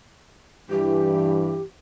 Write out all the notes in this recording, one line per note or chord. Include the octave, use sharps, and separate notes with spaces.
G2 E3 G4